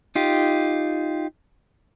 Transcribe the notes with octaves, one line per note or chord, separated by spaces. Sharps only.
D#4 F4 G4